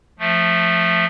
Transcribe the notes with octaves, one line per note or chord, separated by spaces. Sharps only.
F3 A3